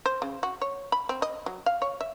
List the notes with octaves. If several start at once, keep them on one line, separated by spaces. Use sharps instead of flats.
C5
C#3
F#4
C#5
B5
C4
D#5
F#3
F5
C#5
E5